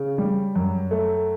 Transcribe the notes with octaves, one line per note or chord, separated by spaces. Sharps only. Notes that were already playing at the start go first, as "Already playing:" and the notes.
Already playing: C#3
G3
F#2
A3